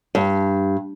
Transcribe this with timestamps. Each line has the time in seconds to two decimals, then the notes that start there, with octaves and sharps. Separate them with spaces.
0.15 G2